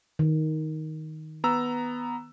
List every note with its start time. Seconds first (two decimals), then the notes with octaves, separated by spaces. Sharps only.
0.19 D#3
1.44 B3 A#5 E6